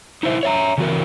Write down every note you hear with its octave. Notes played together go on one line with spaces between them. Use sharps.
D#4 E4 C5 E5
C#5 E5 A#5
C#3 E3 F#4 A#4